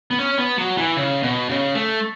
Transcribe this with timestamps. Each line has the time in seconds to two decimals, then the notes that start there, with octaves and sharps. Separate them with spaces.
0.11 B3
0.19 C#4
0.38 B3
0.58 F#3
0.77 E3
0.97 C#3
1.23 B2
1.49 C#3
1.75 A3